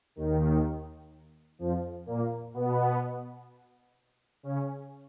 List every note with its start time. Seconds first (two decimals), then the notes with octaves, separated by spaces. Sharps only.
0.16 D#2 D#3
1.59 F2 F3
2.06 A#2 A#3
2.54 B2 B3
4.43 C#3 C#4